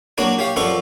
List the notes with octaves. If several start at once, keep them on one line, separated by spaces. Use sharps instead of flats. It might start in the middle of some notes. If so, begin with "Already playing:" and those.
F#3 A#3 D4 C#5 D5
G4 C#5 F5
F#2 F3 F4 A4 D5 C#6